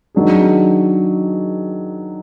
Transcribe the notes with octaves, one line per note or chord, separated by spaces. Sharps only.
D#3 F#3 D4 G#4